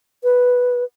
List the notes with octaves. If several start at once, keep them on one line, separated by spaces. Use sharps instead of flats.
B4